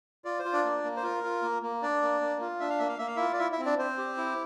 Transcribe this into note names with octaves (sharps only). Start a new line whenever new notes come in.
F4 D5
C5
F4
D4 D5
A#3
A#3
C5
F4 A#4
F4
A#3
A#3
D4 D5
A#3
A#3
F4
D4 E5
F5
A#3 E5
F5
A#3 E5
F5
E4 F4 E5
D5
E4 E5
E4 E5
C4
D4 D5
C4 C5
G4
E4